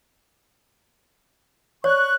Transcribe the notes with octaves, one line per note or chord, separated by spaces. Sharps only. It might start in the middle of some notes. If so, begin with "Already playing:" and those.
C#5 D5 C#6 F#6